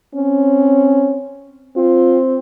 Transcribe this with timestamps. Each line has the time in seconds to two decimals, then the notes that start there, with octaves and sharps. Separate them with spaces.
0.15 C4 C#4
1.76 C4 F4